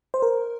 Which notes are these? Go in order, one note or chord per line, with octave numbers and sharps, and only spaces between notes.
C5
A#4